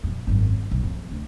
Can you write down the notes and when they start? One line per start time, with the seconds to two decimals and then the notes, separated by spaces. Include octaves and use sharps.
0.03 F2 A#2
0.27 G#1 F#2
0.71 B1
0.84 F2
1.11 D2